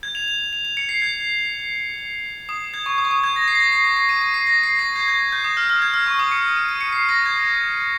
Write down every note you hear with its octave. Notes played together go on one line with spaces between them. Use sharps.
G#6
F7
F7
F7
F7
C#7
C7
G#6
D#6
G#6
C#6
D#6
C#6
D#6
G#6
A#6
C7
A#6
C7
C7
A#6
C7
D#7
D#7
C7
A#6
C7
A#6
G#6
G#6
G6
D#6
F6
F6
G#6
F6
C#6
D#6
C#7
D#7
D#7
C#7
C7
A#6
G#6